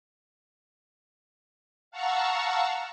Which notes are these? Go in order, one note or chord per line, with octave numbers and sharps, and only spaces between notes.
F5 F#5 A5 A#5 C#6 E6